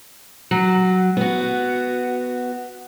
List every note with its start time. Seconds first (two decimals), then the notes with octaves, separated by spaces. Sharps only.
0.51 F#3
1.17 B3 F#4